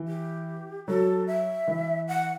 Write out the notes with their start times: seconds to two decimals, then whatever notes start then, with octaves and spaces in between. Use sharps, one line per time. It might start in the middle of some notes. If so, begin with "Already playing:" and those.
Already playing: E3
0.08 G4
0.87 F#3 A4
1.27 E5
1.68 E3
2.08 F#5